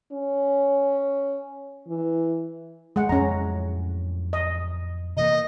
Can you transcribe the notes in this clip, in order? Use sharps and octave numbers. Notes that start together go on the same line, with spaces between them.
C#4
E3
G#3 F#5
F2 A2 F#3 C#4 A#5
D#5
C3 E3 A#3 D#5